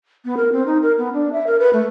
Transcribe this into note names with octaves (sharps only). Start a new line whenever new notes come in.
B3
A#4
C4
D#4
A#4
B3
D4
E5
A#4
B4
A3